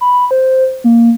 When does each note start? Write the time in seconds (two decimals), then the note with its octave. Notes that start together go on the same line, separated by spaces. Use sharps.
0.01 B5
0.31 C5
0.84 A#3